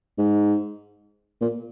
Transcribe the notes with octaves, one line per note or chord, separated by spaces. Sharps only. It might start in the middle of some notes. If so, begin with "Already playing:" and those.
G#2
A#2